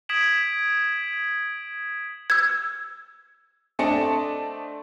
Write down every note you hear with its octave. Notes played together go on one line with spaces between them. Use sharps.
D#6 G#6 B6 D7 E7 F#7
E6 G#6
A3 C4 D4 D#5 A5 C#7